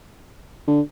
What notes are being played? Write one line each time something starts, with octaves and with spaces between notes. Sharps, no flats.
D3